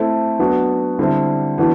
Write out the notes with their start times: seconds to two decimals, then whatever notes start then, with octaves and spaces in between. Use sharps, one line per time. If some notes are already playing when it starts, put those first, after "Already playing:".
Already playing: A3 C4 E4 A4
0.39 F#3 B3 D4 F#4
0.99 D3 G3 C4 E4
1.58 E3 B3 D4 F#4 A4